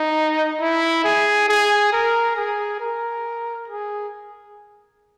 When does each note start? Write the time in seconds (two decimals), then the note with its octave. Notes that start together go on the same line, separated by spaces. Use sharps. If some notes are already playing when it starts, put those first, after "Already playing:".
Already playing: D#4
0.61 E4
1.04 G#4
1.48 G#4
1.92 A#4
2.36 G#4
2.80 A#4
3.68 G#4